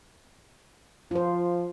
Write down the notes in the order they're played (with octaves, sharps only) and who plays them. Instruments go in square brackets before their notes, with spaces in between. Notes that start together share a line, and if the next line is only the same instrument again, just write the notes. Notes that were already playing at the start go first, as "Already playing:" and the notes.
[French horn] F3 [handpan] F4 C5